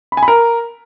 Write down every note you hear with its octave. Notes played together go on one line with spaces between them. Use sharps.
B5
G#5
B5
A#4